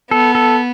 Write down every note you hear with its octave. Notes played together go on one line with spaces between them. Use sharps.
B3 A4
A4